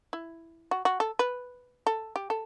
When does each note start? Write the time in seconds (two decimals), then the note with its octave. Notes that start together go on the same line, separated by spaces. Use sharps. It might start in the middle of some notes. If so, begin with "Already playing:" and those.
0.13 E4
0.71 F#4
0.85 F#4
1.00 A4
1.19 B4
1.87 A4
2.16 G4
2.30 A4